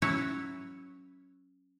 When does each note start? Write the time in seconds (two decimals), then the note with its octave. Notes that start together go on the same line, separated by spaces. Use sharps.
0.02 F#3 C#4 E4 F#4 B4 C#5